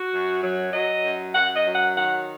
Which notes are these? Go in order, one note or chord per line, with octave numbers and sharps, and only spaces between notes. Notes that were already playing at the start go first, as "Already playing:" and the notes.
Already playing: F#4
F#2
F#3
F#3 D#5
F#2
F#2 F#5
D#5
F#3
F#5
D#3 F#5